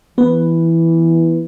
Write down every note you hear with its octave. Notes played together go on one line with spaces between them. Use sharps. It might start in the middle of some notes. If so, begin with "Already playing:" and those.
E3 B3 B4